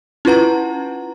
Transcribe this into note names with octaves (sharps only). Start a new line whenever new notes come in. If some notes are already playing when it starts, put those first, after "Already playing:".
C#4 E4 F4 B4 F#5 A#5